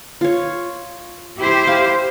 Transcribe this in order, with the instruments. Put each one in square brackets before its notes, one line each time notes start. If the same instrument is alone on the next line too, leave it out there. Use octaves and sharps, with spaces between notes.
[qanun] F4 C#5
[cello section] E4 G4 C5
[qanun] F5